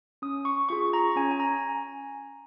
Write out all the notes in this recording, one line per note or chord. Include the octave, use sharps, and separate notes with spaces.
C#4 D#6
C#6
F4 G#4 C#6
A#5
C#4 G#5
G#5
A#5